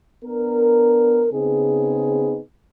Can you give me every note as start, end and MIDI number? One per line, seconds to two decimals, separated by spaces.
0.25 1.27 59
0.25 1.27 62
0.25 1.27 70
1.32 2.39 49
1.32 2.39 59
1.32 2.39 60
1.32 2.39 63
1.32 2.39 68